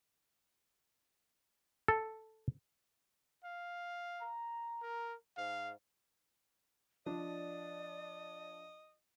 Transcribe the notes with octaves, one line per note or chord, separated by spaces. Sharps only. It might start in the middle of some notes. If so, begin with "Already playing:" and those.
A4
F5
A#5
A#4
G#2 F5
F3 D4 D5 D#5